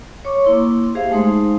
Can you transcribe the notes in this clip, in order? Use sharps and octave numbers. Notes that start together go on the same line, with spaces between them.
C#5 C#6 D6
A#3 E4 C6
G4 G#4 C5 E5 F5
G#3 A3 D#4 C5 C6